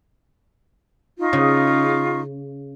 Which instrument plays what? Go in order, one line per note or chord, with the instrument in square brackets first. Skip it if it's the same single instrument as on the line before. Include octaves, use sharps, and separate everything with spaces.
[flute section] D#4 F4 C#6
[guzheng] C#3